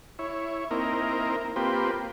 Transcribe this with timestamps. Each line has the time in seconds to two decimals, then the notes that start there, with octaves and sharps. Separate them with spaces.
0.19 E4 C#5
0.71 A#3 C4 D#4 E4 A#4
1.56 A#3 C4 F4 G4 B4